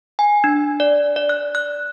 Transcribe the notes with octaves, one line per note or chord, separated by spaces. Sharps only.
G#5
D4
D5
D5
F#6
F#6